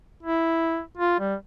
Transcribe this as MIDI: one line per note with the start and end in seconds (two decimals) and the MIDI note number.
0.23 0.80 64
0.97 1.20 65
1.20 1.35 55